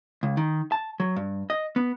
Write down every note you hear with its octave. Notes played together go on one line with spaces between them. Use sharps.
C#2
D#3
A5
F#3
G2
D#5
B3